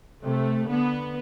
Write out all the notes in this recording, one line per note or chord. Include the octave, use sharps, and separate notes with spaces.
C3 A3
D3 B3